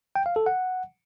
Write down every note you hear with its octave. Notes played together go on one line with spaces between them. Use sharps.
G5
F5
A4
F#5